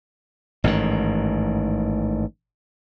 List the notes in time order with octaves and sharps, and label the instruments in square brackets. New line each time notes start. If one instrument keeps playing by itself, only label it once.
[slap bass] A1 G#2 C3 D#3